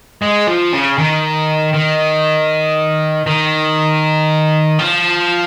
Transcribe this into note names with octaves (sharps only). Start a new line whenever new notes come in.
G#3
F3
C#3
D#3
D#3
D#3
F3